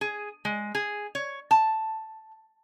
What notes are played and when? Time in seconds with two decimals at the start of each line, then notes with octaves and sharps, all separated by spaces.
0.01 G#4
0.45 G#3
0.75 G#4
1.15 C#5
1.51 A5